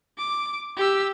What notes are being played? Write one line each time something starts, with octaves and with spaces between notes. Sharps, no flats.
D6
G4 E6